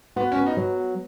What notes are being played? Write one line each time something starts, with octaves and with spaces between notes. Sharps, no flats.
B3 F#4
C#4
B3
D#4
F#3